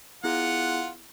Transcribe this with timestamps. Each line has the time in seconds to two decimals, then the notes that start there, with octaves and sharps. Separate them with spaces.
0.24 B3 E4 F4 G#4 F#5